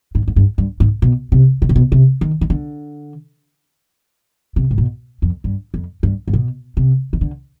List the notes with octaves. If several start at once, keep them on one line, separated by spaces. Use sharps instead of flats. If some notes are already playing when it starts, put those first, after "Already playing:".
G#2
G#2
G2
G2
G#2
B2
C3
B2
C3
B2
C3
D#3
D#3
D3
C3
G#2
B2
F2
G2
F2
G2
G#2
B2
C3
D#3
D3